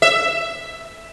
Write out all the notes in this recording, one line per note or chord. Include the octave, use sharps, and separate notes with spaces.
E5